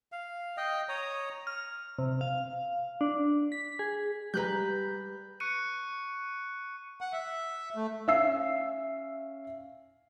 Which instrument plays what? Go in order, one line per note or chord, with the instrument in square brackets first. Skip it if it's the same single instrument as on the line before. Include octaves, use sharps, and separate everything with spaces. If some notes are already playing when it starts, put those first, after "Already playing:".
[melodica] F5
D#5 G5
C#5 A#5 D#6
[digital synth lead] F6
C3
F5
D4
B6
G#4
[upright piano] G3 A#5 [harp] B4 F#6 G6
[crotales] C#6 F#6 C#7 D#7
[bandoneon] F#5
E5
A3
[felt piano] C#4 E5 F5 E6 C7